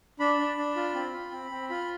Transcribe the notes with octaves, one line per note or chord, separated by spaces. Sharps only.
D4 B5
D4
D4
F4
C4
F4
C4
C4
F4 B5